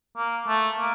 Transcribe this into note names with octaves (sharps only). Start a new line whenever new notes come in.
A#3
A3
A#3